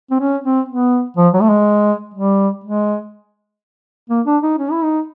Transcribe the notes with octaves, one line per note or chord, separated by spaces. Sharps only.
C4
C#4
C4
B3
F3
F#3
A3
G#3
G3
G#3
A#3
D4
D#4
C#4
E4
D#4